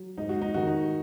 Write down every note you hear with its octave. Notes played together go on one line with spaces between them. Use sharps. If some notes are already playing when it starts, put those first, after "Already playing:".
Already playing: F#3
G#2 D#4
F#4
D#4
D#3 F#4
D#4